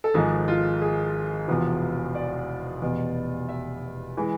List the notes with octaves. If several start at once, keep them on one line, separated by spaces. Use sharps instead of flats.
A4
G#1 G#2 F3 G#3 G#4
F4
G#4
E1 E2 C3 F3
D5
F1 E2 B2
E5
E3 G#3